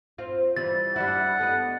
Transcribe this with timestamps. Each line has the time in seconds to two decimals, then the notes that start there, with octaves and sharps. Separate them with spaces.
0.18 C4 F4
0.56 E3 G3 A6
0.96 G3 D4 E4 F#5
1.39 A3 B3 D#5